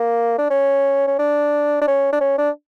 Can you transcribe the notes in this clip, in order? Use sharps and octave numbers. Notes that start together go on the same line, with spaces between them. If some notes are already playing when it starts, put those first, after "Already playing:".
Already playing: A#3
D4
C#4
C#4
D4
D4
C#4
D4
C#4
D4